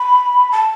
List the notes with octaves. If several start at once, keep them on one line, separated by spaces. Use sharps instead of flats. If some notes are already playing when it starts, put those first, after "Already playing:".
Already playing: B5
A5